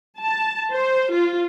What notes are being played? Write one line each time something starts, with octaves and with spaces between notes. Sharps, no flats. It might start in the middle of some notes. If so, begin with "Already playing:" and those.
A5
C5
F4